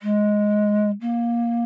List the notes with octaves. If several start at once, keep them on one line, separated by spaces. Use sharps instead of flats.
G#3
A#3